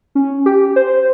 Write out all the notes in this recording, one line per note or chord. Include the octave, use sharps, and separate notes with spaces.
C#4
G4
C5